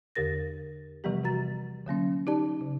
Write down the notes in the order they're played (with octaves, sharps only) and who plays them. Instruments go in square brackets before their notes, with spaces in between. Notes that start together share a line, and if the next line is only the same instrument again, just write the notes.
[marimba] E2 D3 G4 A#4 A6 A#6
C3 E3 F3 G3 B3 G4
C3 F#4 A#5 A6
D3 F#3 A#3 C#4
D#4 G4 D5 A5
C#3